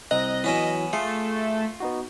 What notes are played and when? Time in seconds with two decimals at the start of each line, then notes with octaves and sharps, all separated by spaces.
0.11 C2 C4 D#5 A#5 F#6
0.44 E3 F#3 B3 C#4 E4
0.93 A3 F4 G#4
1.80 B3 D#4 F#4